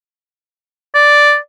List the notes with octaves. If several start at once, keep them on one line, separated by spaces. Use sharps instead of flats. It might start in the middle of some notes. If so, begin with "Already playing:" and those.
D5